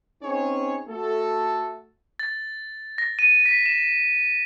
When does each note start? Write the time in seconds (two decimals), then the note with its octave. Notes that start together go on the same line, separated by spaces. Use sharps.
0.23 C4 C#4 D#4 G#4 C#5
0.89 A3 F#4 A4
2.19 A6
2.98 A#6
3.19 D#7
3.46 B6
3.66 E7